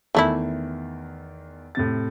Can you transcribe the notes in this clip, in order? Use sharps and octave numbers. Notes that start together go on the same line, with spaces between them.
E2 D#3 E3 A3 E4
A2 C3 A6